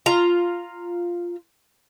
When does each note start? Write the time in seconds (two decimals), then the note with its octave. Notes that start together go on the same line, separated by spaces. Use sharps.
0.06 F4 A#5